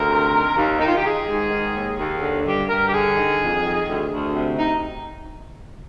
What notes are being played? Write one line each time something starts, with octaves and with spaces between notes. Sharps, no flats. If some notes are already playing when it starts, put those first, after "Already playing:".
Already playing: D2 A#4
C3
D#3
D#2
D#3 D#4
F4
G4
D#3 G#4
G#2
D#3
D#2
D#2
D3
G2 G4
G2 A#4
G4
D3 G#4
D#3
F2
D#3
D2
D2
C3
D#4